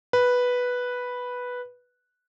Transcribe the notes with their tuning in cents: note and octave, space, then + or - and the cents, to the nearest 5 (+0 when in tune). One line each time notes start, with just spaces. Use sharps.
B4 -5